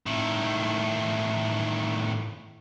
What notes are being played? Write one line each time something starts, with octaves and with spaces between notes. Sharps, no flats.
A2 D#3